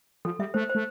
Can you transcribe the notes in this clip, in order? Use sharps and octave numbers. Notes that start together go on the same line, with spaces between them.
F3 A4
G3 E5
A3 C5
C5
A3